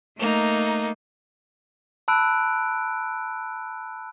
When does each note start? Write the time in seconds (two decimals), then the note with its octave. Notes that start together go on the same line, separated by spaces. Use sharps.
0.17 A3 A#3 D#4
2.08 A5 B5 E6 F#6 D7